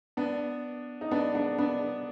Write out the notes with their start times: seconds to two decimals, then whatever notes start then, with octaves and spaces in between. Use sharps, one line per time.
0.17 B3 D4
1.01 D#4
1.11 B3 D4
1.35 B3 D4
1.58 B3 D4